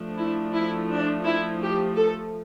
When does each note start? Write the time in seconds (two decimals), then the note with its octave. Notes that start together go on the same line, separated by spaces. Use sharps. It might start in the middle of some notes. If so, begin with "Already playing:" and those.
Already playing: F3 A3 D4
0.18 E4
0.54 E4
0.90 D4
1.26 E4
1.62 G4
1.97 A4